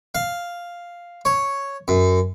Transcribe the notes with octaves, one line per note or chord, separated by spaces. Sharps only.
F5
C#5
F#2